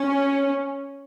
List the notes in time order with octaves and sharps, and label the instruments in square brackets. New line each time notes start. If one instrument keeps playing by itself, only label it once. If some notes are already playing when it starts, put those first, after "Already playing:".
Already playing: [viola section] C#4